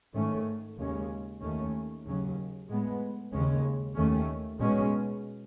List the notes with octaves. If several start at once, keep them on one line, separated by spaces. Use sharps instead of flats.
G#2 D#3 A3 C#4
D#2 C#3 G#3 C#4
D#2 D#3 A3 C#4
D#2 C#3 F#3 C#4
A2 G#3 B3
D#2 C#3 G#3 C#4
D#2 D#3 A3 C#4
B2 G#3 C#4